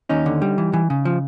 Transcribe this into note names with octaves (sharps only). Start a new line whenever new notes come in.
D#2 C#4 D#4
D3
G3
E3
E3
C#3
F3